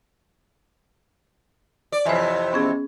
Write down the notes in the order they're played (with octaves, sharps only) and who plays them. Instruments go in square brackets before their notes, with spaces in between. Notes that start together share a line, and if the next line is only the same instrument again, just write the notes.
[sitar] D5
[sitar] F2 C3 E3 [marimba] C5 C#5 G#5
[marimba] B3 C#4 G#4